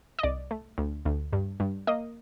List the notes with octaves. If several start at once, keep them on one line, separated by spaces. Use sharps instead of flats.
D#5
C2 D5
A3
D2
D2
G2
G2
A#3 D#5